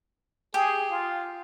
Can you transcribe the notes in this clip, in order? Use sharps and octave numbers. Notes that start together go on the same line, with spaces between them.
G4 G#4
F4